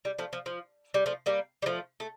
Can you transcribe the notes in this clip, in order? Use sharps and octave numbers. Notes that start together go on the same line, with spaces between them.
G3
F3 A3
F3
F3
G3
F3 A3
G3 A#3
G3
F3 A3
A3